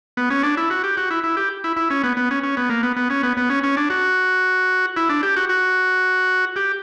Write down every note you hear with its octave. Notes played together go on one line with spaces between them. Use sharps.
B3
C#4
D4
E4
F#4
G4
F#4
E4
E4
G4
E4
E4
C#4
B3
B3
C#4
C#4
B3
A#3
B3
B3
C#4
B3
B3
C#4
C#4
D4
F#4
E4
D4
G4
F#4
F#4
G4